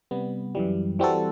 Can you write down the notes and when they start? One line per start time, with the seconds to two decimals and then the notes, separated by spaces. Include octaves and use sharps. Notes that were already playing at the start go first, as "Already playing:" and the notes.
0.11 C3 G3 B3
0.55 F#2 E3 G3
0.99 E3 G3 C4 F#4 A4